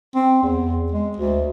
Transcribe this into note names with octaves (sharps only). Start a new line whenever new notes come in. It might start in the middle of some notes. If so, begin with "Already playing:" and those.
C4
E2
G#3
D2